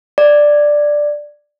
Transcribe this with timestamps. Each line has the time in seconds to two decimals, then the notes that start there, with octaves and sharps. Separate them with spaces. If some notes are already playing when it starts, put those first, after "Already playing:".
0.18 D5